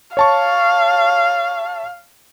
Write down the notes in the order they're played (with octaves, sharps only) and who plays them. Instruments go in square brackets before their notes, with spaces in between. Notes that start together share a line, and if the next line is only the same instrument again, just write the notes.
[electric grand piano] C#5 A5 C#6 [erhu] F5